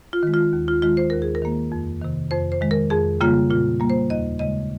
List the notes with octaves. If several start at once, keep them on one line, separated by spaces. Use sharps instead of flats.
F4
D#3 G#3
F4
D#2
F4
D#3 G#3 F4
C5
D#2 A#4
G#4
A#4
D#3 A#3
F2
C3 D#3
F2 C5
C5
D#3 G#3
A#4
F2 G#4
C#3 G3 A#3 F4
A#2 F4
G3 A#3
C5
D#2 D#5
C#3 G#3 D#5